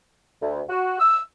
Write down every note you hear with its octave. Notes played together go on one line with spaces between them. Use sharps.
D2
F#4
E6